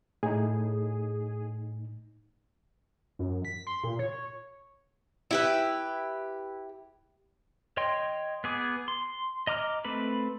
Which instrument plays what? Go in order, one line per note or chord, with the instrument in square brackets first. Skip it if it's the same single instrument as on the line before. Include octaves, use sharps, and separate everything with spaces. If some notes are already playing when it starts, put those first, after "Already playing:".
[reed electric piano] A2 D#4 [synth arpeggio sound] G#4
[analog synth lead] F#2
B6
C6
A#2
C#5
[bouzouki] E4 G4 B4
[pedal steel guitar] C#5 D#5 G5 C6
B3 G#4 D6
C6
D#5 A#5 D6 F6
A3 C4 B4 B5